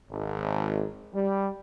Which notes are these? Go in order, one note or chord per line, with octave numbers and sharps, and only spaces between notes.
G#1
G3